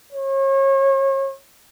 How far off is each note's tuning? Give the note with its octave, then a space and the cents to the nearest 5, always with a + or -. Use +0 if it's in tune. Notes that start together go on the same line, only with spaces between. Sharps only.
C#5 -35